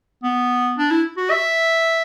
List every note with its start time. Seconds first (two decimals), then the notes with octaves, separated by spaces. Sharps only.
0.24 B3
0.78 D4
0.91 E4
1.17 F#4
1.31 E5